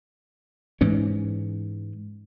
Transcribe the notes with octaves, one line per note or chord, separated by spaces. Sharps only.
G#2 E3 C#4